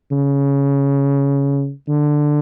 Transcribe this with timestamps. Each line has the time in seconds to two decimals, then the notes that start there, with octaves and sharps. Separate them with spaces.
0.12 C#3
1.88 D3